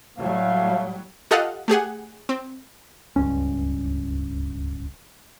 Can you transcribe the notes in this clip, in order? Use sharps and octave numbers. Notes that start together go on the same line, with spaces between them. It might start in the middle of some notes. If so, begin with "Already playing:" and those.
A2 F#3 G3 A3 F5
F4 G4 A4 D#5 F5 F#5
A3 G4 G#4 F#5
C4
D1 C#2 G2 C#4